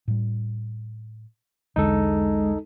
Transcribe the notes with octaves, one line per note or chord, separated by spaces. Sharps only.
A2 G3
B1 E2 D3 G#3 D#4 A4